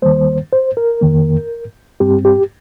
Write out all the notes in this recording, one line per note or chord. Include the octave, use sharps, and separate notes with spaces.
D#2 D#3 G3 A#3 C5
C5
A#4
F2 D#3 A#3
G2 G3 C4 G4
G4